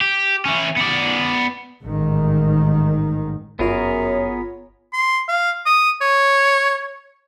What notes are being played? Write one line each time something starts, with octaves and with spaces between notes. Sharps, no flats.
G4
E3 C#4
B3 D5
A1 G#2 D#3
G1 F#2 B3 F4 G#4 A#4 C#5
C6
F5
D#6
C#5